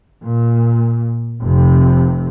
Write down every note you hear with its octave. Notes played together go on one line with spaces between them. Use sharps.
A#2
F1 C3